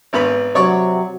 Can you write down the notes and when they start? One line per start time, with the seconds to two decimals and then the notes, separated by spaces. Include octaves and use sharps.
0.13 G#1 B3 B5
0.55 C3 F#3 C#5 D5 C#6